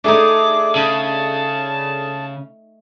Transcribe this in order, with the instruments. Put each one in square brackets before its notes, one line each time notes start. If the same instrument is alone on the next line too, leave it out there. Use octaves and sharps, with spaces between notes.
[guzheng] A3 D#4 [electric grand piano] D4 G#4 A4 [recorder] D6
[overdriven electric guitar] C#3 [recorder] A5